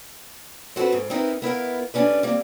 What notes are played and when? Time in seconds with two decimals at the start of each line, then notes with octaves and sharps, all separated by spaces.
0.76 C4 F#4 G#4 A4 B4
0.92 G#2
1.10 C4 D#4 E4 A#4 B4
1.42 B3 E4 A#4 F5
1.94 G3 A3 A#3 C#4 D4 B4
2.23 G3 A#3 C4